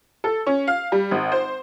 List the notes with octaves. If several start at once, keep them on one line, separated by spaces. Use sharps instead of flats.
A4
C#4
F5
G3
G#1
C5